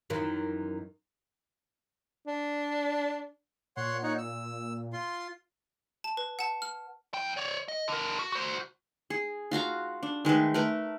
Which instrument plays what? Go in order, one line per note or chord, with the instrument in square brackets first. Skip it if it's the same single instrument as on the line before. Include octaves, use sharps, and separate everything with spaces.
[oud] F#2 D#3 E3
[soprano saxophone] D4
[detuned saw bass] A#2 [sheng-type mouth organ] C#5 F#5 C6
[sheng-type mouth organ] D#4 C#5 F#5
E6
F4 C6
[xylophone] A5
B4
F#5 A5
F6
[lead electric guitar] F2 G5
C#5 D5
D#5
D3 A#4
F#4
F#4 C5
[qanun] G#4
F4 F#4 F5 A#5
D4
D#3 G#3 A3 B4
A3 A#4 B4 A#5